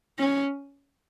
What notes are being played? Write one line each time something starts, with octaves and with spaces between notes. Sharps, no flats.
C#4